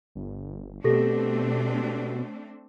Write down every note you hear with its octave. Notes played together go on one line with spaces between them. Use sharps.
G1
B2 A3 C4 D4 G4 A4 A#6